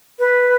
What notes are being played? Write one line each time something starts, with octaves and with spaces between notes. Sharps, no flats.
B4